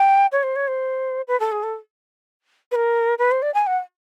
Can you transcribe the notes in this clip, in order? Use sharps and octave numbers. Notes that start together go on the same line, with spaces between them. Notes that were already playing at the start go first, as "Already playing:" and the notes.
Already playing: G5
C#5
C5
C#5
C5
B4
A4
G#4
A4
B4
A#4
B4
C5
D5
G#5
F#5